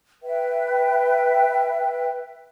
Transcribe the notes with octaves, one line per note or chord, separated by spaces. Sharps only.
B4 E5 G5